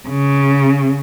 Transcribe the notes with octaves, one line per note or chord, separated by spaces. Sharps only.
C#3